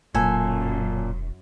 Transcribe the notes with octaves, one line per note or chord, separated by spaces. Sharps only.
E1 F#2 A#2 A4 G#5